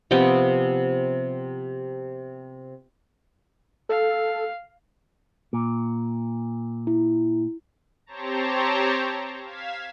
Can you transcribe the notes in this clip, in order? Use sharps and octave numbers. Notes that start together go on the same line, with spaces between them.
C3 F3 B3 G5
A4 F5
A#2
E4
C4 G4 C5 C#5 A5 A#5
F5 G#6 B6 E7